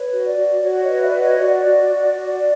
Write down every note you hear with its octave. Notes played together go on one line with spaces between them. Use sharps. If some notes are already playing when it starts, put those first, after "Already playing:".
Already playing: B4 C#5
F#4
D5
F#4
F#4 C#5
C#5 D#5
B4
D5 E5
F#4
C#5 D#5
F#4 D5
F#4
F#4
F#4 D5